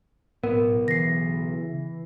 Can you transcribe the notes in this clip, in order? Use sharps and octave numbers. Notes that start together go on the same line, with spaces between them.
B1 A2 B3 A#4
C#3 E3 A#6 C7